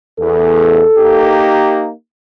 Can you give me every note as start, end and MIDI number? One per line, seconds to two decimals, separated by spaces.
0.19 0.82 40
0.19 1.53 69
0.97 1.91 58
0.97 1.91 63
0.97 1.91 67